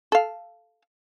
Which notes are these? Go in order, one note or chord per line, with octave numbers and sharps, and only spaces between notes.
A4 F5